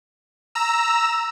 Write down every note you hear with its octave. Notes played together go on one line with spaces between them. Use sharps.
A#5 E6